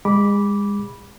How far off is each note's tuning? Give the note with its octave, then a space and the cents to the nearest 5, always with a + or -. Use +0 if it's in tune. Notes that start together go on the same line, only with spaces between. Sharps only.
G#3 -35 B5 -10 D6 -10